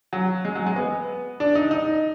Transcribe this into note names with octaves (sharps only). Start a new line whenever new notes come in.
F#3
G#3
F#3
G#3
B3
D4
D#4
D#4